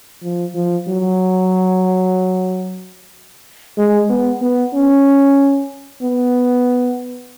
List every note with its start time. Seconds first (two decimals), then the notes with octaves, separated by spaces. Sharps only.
0.23 F3
0.55 F3
0.88 F#3
3.78 G#3
4.09 B3
4.42 B3
4.74 C#4
6.02 B3